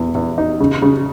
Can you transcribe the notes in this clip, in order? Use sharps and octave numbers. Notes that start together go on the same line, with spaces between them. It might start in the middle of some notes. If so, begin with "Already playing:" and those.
Already playing: E2
E2
D#4
C#3
C#3